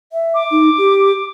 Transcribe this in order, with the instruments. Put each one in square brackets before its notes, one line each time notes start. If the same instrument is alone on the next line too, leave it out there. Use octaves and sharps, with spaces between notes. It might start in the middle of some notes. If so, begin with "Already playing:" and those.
[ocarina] E5
[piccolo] D6
[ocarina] D#4
G4